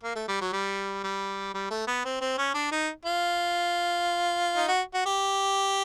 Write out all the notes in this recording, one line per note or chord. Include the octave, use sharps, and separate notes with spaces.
A#3
A3
G3
F#3
G3
G3
G3
A3
B3
C4
C4
C#4
D4
D#4
F4
D#4
F#4
F#4
G4